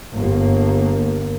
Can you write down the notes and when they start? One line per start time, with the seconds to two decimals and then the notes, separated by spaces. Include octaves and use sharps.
0.13 G1 A#3